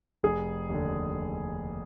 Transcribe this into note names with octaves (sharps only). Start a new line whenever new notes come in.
F1 G#4
D#2 D3